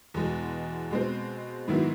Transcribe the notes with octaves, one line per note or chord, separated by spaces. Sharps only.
E2 B2 G#3
B2 G#3 C4
G#2 D#3 F#3 B3 E4